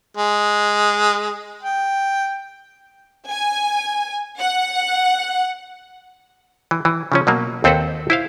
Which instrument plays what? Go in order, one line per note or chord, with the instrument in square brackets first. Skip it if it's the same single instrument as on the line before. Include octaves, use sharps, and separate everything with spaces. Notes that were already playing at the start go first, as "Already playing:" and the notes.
[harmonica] G#3
G5
[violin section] G#5
F#5
[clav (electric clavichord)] E3
E3
C#3 F3 C#4
B2 F#3 A#3
D#2 C4 A4 B4 C5 F#5
E4 C5 F5